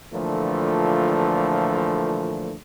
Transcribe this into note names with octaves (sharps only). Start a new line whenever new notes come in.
A#2 D3 E3 F3 A3